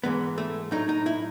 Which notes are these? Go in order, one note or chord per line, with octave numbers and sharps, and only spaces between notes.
G#2 E3 G#3 B3
A3
A2 F#3 D#4
D#4
E4